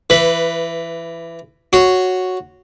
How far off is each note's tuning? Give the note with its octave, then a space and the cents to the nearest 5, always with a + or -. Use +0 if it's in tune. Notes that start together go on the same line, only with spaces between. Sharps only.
E3 +20 B4 +0
F#4 -5 C#5 +0 C6 -20